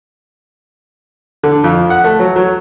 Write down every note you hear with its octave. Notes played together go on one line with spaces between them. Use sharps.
D3
F2
F#5
A3
F#3
F#3